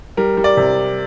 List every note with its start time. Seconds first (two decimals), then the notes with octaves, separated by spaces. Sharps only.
0.17 G3 A#4
0.37 G3
0.44 D5
0.57 C3